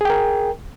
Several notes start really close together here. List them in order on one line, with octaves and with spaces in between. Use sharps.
G#4 G5 A#4